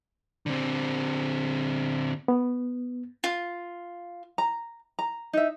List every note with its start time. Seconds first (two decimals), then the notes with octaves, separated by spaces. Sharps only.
0.46 D3 C4
2.28 B3
3.24 F4
4.38 A#5
4.99 A#5
5.33 D#4 E5